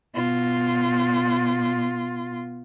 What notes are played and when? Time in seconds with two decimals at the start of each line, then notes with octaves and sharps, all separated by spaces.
0.15 B2 F4